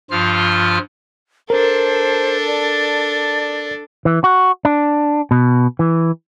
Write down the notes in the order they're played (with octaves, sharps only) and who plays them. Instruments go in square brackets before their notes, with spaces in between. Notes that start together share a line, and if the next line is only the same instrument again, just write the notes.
[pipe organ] G2 F3 F4 F6
[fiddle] D4 A4 [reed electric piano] A#4 [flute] C5
[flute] D5
[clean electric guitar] E3
F#4
D4
B2
E3